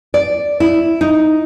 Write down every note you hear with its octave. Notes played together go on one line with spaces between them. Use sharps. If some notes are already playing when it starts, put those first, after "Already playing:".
D5
E4
D#4